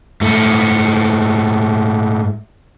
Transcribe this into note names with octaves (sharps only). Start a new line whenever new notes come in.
G#2 A3